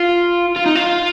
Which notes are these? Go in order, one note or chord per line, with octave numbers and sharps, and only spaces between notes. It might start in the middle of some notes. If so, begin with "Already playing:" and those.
Already playing: F4
F4
D#4
F4